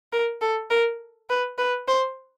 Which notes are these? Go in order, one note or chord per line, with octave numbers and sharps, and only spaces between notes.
A#4
A4
A#4
B4
B4
C5